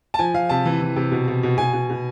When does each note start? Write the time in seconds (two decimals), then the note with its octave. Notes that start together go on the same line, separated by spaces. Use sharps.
0.14 A5
0.19 F3 G#5
0.34 F3 F5
0.49 C3 A5
0.65 E3
0.81 E3
0.96 C3
1.12 B2
1.28 B2
1.43 B2
1.58 B2 G#5
1.73 B2
1.90 B2